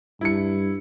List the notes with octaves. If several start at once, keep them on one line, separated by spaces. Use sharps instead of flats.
G2 E4 C#7